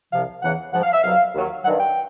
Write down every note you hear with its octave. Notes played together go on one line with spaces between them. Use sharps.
C2 C3 F3 F5
E2 C#3 E3 F#5
G#2 F3 F#5
F5
E5
C2 B2 F#3 F5
D#2 D#3 F#3
G2 D#3 F#3 F#5
G5